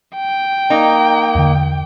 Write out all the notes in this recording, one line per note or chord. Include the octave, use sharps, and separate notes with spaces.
G5
A#3 D#4
E2 D3